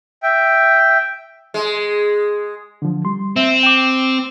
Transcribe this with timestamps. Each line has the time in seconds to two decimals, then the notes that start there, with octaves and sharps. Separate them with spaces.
0.23 E5 G5
1.54 G#3
2.82 D3 F3
3.05 G3 C6
3.36 C4 E5
3.63 G5 D6